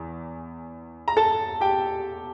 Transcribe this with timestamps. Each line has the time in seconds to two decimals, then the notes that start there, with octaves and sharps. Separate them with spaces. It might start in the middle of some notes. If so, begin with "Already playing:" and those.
Already playing: E2 E3
1.08 A#5
1.17 A4 A5
1.61 G4 G5